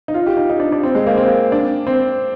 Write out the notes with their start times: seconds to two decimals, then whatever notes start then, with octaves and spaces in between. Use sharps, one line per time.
0.08 D#4
0.14 F4
0.26 G4
0.37 D#4
0.49 D#4
0.60 D4
0.72 D4
0.83 C4
0.95 G#3
1.06 A#3
1.17 C4
1.52 D4
1.87 C4